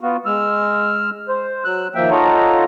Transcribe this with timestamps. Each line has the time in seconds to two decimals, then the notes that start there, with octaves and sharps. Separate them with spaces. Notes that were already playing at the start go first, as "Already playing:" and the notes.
0.01 B3 F4 F#4
0.26 G#3 E6 F6
1.28 C5
1.64 F#3 E6 F#6
1.95 D#2 F3 A#3 E5 G5
2.11 D#4 F4 A4 C#5 F#5 A#5